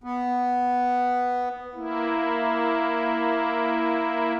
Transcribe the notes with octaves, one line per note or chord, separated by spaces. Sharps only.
B3
A#3 E4